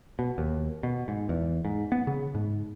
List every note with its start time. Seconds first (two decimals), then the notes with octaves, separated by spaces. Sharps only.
0.19 B2
0.38 D#2
0.83 B2
1.08 G#2
1.29 E2
1.65 G#2
1.92 B3
2.07 C#3
2.35 G#2